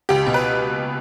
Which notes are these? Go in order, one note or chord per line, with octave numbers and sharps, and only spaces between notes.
C#2 G4
B2
B4